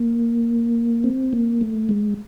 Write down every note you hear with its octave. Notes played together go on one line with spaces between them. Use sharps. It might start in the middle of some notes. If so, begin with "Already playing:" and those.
Already playing: A#3
C4
A#3
A3
G#3